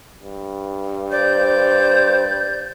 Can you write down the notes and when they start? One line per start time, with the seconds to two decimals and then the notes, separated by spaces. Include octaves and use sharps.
0.22 G2
1.11 C5 D5 G6